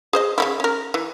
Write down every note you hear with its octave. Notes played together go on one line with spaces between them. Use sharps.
G#4 C5 D#5
C#3 E3 E4
C#4 A#4
E3